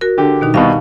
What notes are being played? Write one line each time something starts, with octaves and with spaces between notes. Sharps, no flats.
F#4 A#4
D3 G4
B2 D#3 D#4
C2 B2 F5 A5